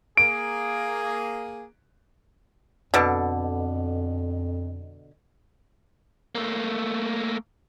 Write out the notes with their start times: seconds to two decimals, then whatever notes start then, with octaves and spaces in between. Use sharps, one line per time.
0.17 A#3 G#4 D7
2.94 F2 B2 D3
6.35 A3 A#3